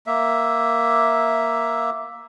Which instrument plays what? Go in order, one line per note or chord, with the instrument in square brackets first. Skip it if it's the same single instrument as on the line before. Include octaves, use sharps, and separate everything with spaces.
[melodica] A#3 E5